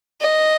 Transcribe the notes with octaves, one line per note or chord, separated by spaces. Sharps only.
D#5